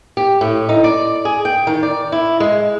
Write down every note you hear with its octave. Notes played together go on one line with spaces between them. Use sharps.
G4
A2
D#4
D5
G#4
G5
D#3
D5
E4
G#3